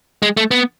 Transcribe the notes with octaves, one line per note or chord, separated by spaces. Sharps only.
G#3
A3
B3